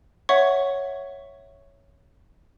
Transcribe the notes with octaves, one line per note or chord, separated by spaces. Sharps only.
C#5 E5 F#5 C#6